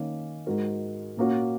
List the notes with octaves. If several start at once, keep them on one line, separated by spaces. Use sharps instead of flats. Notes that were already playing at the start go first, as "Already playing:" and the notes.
Already playing: D#3 A#3 C#4
G#2 G#3 F#4 A#4
A#2 A#3 C#4 F#4